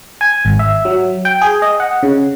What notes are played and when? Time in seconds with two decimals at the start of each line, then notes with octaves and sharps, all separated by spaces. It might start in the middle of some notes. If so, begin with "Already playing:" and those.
0.21 G#5
0.45 G#1
0.59 E5
0.85 F#3
1.25 G5
1.41 G#4
1.62 D#5
1.80 F#5
2.03 C#3